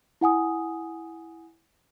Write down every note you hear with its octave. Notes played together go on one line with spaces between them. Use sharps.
E4 F#5 G#5 D#6